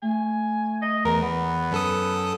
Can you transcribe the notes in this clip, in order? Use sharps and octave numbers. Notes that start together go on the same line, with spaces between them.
A3 G#5
D#5
E2 A#4
E3 B3
F#2 A4 A5 D#6